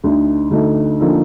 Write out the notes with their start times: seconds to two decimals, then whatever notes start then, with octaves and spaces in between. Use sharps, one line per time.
0.04 D2 D3 A3 D#4
0.51 D2 D3 A3 D#4
1.00 D3 F3 A#3 D#4 A4